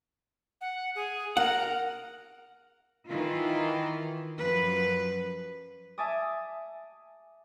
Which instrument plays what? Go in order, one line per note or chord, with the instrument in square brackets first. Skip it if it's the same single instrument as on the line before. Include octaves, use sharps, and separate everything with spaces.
[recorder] F#5
G#4
[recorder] A#4 [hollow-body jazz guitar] F#5
[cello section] D#3 E3 E4 F4
F#2 F3 B4
[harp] E5 G#5 A5 D6 D#6